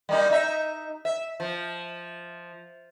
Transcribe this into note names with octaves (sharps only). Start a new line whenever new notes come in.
G3 A#3 D#4
D#4 E5
E5
F3